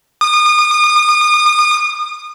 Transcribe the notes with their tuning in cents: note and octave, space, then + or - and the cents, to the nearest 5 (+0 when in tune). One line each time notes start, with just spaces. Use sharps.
D#6 -35